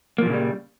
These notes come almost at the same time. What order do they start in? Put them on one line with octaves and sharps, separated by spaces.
A#3 F3 A#2 C#3 G3